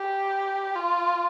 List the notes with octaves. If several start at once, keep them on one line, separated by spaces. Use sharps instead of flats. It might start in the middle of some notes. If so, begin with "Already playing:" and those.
Already playing: G4
F4